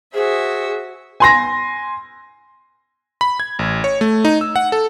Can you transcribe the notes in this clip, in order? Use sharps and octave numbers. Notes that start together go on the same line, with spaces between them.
F#4 G#4 C5 E5
G#5 C6 A#6
B5
G#6
A1
C#5
A3
D#4
E6
F#5
A4